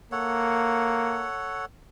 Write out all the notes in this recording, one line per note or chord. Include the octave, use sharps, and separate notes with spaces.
A#3 A4 C#5 F#5